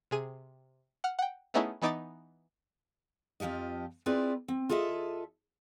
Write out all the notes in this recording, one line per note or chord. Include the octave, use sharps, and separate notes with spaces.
C3 G#4 D#7
F#5 F6
F#5 G5
A3 B3 C#4 D#4 E4 G#4
E3 B3 D#4 D6 D#6 A6
F2 D#3 F3 G4 D#5
C4 E4 F4 G#4 B4 D5
C4
F4 G#4 A4 D#5 E5